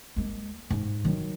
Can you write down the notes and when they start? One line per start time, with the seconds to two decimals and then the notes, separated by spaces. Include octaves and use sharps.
0.16 G#3 A#3
0.70 G#2
1.05 D#3 F#3